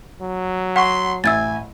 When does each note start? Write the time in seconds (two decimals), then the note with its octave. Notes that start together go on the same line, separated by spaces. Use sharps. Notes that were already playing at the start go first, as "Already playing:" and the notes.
0.21 F#3
0.76 F#5 C6 C#6
1.24 A1 E5 G#5 E6 G#6 A6